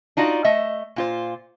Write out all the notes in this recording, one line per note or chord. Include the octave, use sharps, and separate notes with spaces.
D4 D#4 F4 F#4 D5
A3 D#5 E5
A#2 F4 C5